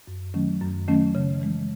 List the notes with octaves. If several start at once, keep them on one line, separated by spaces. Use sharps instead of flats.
F#2
D#3 F#3 A3 C#4
F#2
D#3 F#3 A3 C#4
C#3
E3 G#3